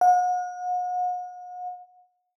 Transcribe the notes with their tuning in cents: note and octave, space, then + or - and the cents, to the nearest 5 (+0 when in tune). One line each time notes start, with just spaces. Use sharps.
F#5 -40